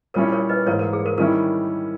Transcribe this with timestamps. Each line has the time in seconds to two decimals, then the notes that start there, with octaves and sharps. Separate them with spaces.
0.14 A#2 G3 C#4 E4 A#4 C#5
0.32 A#4 C#5
0.49 B4 D#5
0.66 G#2 E3 A#3 A#4 C#5
0.79 A#4
0.93 G#4
1.06 A#4
1.18 D#3 G3 C#4 E4 A#4